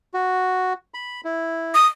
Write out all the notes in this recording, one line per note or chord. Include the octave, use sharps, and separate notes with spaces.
F#4
B5
E4
D#6